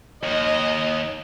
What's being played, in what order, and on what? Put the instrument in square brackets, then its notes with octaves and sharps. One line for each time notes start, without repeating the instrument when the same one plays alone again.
[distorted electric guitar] D#2 [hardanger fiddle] D#5